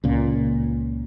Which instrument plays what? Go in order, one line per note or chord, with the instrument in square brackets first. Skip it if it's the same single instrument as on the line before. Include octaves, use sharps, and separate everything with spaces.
[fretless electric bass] C#2 A#2